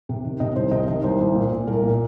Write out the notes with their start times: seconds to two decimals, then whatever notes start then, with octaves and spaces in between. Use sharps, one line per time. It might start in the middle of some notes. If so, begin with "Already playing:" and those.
0.09 C3
0.25 D#3
0.40 C3 D#5
0.56 C2 C5
0.72 C3 D#5
0.88 D#3 D#5
1.03 C2 C5
1.20 C2
1.35 A#2
1.52 A#2
1.67 C2 A#4
1.83 A#2